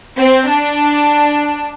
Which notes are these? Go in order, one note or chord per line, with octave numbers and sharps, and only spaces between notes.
C4
D4